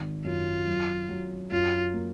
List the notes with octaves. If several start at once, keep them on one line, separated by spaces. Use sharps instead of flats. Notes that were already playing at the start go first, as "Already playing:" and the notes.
Already playing: G#1
F#2 F4
F#3
F#3
F#2 F4
A#3